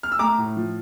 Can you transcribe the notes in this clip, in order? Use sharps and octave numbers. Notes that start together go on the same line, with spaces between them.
F6
E6
A3 A#5 D6
A2
F3